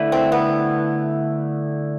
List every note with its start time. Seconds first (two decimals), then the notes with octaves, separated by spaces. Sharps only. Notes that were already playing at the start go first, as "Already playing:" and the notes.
Already playing: D3 A3 E4 B4
0.12 C4
0.32 B3